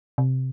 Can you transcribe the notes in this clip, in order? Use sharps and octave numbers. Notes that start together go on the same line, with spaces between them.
C3